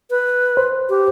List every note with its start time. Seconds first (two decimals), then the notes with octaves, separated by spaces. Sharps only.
0.10 B4
0.57 C5
0.89 G4